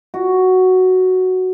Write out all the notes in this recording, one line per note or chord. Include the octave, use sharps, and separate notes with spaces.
F#4